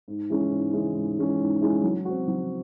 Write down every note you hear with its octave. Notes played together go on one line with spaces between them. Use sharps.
G#2
E3 G#3 C#4
G#2
E3 G#3 C#4
G#2
E3 G#3 C#4
G#2
E3 G#3 C#4
F#3
C4 F#4
F#3